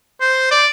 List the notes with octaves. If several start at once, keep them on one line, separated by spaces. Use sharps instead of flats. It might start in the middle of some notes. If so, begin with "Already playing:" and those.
C5
D5